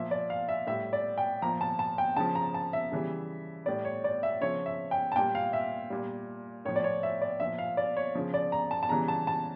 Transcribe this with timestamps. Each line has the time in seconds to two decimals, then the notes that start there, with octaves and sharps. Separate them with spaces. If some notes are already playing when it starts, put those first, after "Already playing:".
Already playing: A#2 F3 E5
0.11 D5
0.30 F5
0.49 E5
0.67 A2 G3 E5
0.93 D5
1.18 G5
1.42 A#2 F3 A#5
1.61 A5
1.79 A5
1.98 G5
2.17 C#3 F3 A5
2.35 A#5
2.54 A5
2.73 E5
2.92 C#3 E3 G3
3.66 A2 G3 D5
3.85 C#5
4.04 D5
4.23 E5
4.41 C#3 F3 C#5
4.66 E5
4.91 G5
5.12 A5
5.16 A#2 G3 G5
5.35 F5
5.53 E5
5.90 A#2 G3
6.65 A2 F3 C#5
6.76 D5
6.84 C#5
7.03 E5
7.22 D5
7.40 A#2 F3 E5
7.58 F5
7.77 D5
7.97 C#5
8.15 C#3 F3
8.34 D5
8.52 A#5
8.71 A5
8.83 A5
8.89 C#3 E3 G3 A#5
9.08 A5
9.27 A5